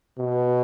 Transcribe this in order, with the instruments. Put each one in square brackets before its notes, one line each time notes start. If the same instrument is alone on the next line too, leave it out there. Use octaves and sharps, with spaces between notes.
[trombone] B2